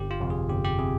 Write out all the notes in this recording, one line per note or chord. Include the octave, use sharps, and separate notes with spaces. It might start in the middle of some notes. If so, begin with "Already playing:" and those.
Already playing: G1 G4
F4
F2 C3
G#4
G1 G4
G4
C3 G#4